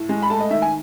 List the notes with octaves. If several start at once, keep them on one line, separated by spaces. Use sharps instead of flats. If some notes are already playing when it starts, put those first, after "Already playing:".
Already playing: A2
G#3
B5
A3 A5
D#5
D#3 E5
G#5